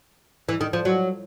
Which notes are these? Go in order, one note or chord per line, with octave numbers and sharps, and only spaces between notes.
E3
D#3
F3
F#3